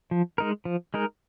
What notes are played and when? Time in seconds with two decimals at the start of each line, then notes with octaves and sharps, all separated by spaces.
0.11 F3
0.38 G#3 D#4 A#4
0.65 F3
0.94 G#3 D#4 A#4